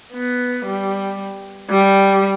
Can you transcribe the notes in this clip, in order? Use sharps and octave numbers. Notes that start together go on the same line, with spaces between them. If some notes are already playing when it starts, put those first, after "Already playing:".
B3
G3
G3